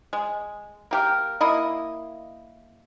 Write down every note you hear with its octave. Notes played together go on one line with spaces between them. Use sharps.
G#3
A#3 G4 A#4
A#3 E4 D#5